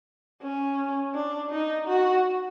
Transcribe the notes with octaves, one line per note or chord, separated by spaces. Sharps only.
C#4
D4
D#4
F#4